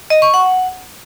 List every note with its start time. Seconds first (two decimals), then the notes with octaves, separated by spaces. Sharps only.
0.10 D#5
0.22 C#6
0.34 F#5